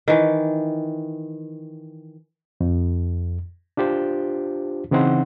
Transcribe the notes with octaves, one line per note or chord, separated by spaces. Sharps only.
D#3 E3
F2
D4 F4 G4 C5
C#3 E3 C4 D#4 F#5 C6